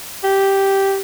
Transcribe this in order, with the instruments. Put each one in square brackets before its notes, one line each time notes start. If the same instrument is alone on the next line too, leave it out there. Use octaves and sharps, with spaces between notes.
[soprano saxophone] G4